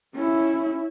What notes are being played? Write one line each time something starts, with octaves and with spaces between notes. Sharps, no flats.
C#4 E4